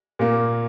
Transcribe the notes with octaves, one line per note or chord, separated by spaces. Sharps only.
A#2 A#3